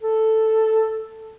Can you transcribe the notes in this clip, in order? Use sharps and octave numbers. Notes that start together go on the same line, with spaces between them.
A4